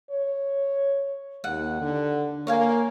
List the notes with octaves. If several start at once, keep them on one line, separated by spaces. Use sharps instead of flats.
C#5
D#2 F#5
D3
A#3 C#5 F5 G#5